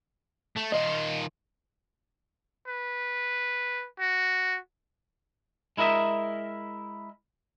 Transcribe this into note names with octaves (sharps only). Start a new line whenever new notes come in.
A3
D#3 F4 D#5
B4
F#4
G#3 E4 A#4 D#5 E5